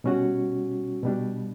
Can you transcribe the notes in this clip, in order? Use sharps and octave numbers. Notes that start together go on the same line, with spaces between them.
B2 G3 C#4 F#4
B2 G3 D4